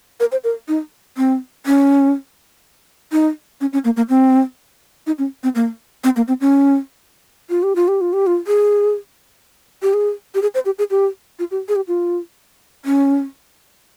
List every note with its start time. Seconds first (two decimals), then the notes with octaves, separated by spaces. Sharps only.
0.20 A#4
0.32 C5
0.44 A#4
0.68 D#4
1.17 C4
1.66 C#4
3.12 D#4
3.61 C#4
3.73 C#4
3.85 A#3
3.97 A#3
4.09 C4
5.07 D#4
5.18 C#4
5.43 C4
5.55 A#3
6.04 C4
6.16 A#3
6.28 C4
6.41 C#4
7.50 F4
7.63 G4
7.76 F4
7.88 G4
8.01 F4
8.13 G4
8.27 F4
8.47 G#4
9.82 G4
9.94 G#4
10.35 G4
10.42 G#4
10.55 C5
10.66 G4
10.79 G#4
10.91 G4
11.39 F4
11.51 G4
11.69 G#4
11.76 G4
11.88 F4
12.85 C#4